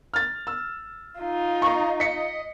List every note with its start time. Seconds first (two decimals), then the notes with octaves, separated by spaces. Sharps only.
0.14 F6 A6
0.47 E6
1.20 D#4 F4
1.62 D#5 A#5 C#6
2.00 D#5 B6 C#7